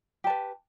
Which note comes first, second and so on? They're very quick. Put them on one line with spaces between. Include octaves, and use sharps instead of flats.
G4 A5 B4